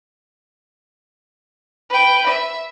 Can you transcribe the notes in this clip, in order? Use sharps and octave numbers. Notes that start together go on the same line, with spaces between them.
B4 G5
E5